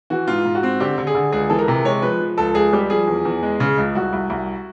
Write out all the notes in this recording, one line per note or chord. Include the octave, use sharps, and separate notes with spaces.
E3 F#4
G#2 F4
G#2
F#4
C4
D3 G4
D3
G#4
D3
C#2 G#4
E3 A4
A#4
C3
G#3 C#5
F3 B4
F3
C#2 A4
C#2 G#4
G3 G4
F3 G#4
E2
E2
G#3
C#3
C#2
C2 F#4
C2
C2